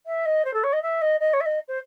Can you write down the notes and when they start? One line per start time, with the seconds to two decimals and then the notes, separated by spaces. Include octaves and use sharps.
0.06 E5
0.26 D#5
0.45 C5
0.54 A4
0.63 C#5
0.73 D#5
0.82 E5
1.01 D#5
1.20 D#5
1.33 C#5
1.40 E5
1.46 D#5
1.68 C5